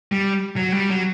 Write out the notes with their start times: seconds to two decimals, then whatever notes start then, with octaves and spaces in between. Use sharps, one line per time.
0.12 G3
0.56 F#3
0.73 G3
0.90 F#3